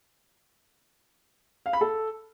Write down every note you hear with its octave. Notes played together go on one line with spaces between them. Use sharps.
F5
B5
A4